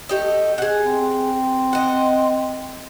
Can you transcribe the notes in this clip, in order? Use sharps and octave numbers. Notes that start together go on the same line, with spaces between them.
A3 G4 D#5
G#4 F#5
C4
D#5 F#5